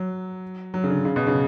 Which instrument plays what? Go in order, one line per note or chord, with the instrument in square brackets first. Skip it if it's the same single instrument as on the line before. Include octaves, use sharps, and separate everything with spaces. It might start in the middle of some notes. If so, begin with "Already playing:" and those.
Already playing: [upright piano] F#3
F#3
C#3
D3
C#3
B2
C#3